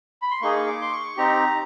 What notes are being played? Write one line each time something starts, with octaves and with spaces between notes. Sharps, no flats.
B5
C6
A#3 D#4 G#4 C#6
D6
C6
C#6
C4 D#4 G4 A#5